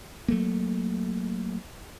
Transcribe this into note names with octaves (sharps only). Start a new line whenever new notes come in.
F#3 A3 A#3